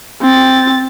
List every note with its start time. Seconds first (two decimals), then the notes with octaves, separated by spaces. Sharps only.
0.22 C4 A6